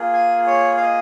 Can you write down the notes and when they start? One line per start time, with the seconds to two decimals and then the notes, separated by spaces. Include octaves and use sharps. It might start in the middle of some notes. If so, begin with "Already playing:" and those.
Already playing: A#3 F4 G#4
0.13 G#5
0.47 C#5
0.77 F5
0.82 D#5